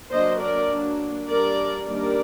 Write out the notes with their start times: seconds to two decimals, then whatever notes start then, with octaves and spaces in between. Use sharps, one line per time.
0.11 F#3 A#3 D4 C5 D#5
0.40 A#4 D5
0.70 F#3 A#3 D4
1.28 G3 A#3 D4 A#4 D5
1.86 D#3 G3 A#3 D4 A#4 D5